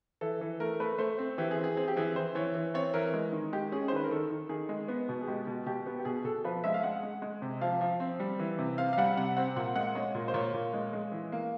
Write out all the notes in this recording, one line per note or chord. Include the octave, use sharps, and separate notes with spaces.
E3 A4
E3
A3 A#4
A3 B4
A3 C5
C4
E3 G4
G#4
C4
G#4
C4 G#4
G4
E3 G#4
E3 C5
E3 C#5
E3
C4 C#5
E3 A#4
G#3
D#3
G#3 G4
C#4 G#4
C5
D#3 B4
A#4
D#3 A4
D#3
D#3 G#4
G#3
B3
B2
G#4
G#3 G4
B2
B2 G4
B3
G4
B2 G#4
B2 A4
F3 B4
G#3 E5
F5
G#3 F#5
G#3
G#3
C3
F3 F5
F3
C4
G3
E3
C3
C4 F5
F5
G3 F#5
C3 F#5
C4 F#5
A#2 F#5
G#3 F#5
G#3 C#5
A#2
C5
A#2 C#5
A#2
G#3
G#3
E3
A#3